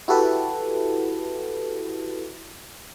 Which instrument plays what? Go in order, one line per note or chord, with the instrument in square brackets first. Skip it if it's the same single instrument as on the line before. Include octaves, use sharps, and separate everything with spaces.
[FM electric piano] E4 F#4 G4 A4 B4